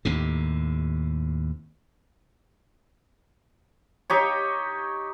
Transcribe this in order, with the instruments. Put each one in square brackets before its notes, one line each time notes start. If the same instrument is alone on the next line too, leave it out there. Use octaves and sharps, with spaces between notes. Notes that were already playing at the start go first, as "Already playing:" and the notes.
[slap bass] D#2 A2 C3
[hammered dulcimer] D#4 G4 C#5